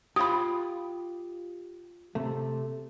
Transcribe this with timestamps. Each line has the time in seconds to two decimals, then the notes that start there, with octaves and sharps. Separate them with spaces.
0.16 F4 G4 B5 D#6
2.15 C3 A3